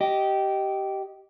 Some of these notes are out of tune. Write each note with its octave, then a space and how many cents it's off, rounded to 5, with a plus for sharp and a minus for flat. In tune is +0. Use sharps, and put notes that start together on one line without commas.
G4 -15 D#5 +0